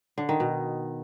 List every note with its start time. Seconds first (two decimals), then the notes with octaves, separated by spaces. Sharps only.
0.18 D3
0.29 D#3
0.40 B2